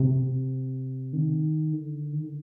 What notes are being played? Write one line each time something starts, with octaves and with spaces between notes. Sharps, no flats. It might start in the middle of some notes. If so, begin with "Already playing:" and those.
Already playing: C3
D#3
D3
D#3
D3